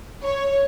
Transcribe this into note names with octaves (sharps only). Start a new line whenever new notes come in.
C#5